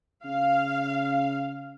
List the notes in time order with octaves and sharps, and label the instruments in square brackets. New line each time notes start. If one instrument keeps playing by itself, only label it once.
[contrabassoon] C#3 [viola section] F5